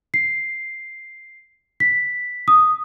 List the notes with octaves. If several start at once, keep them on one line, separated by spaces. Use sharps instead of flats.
C7
B6
D#6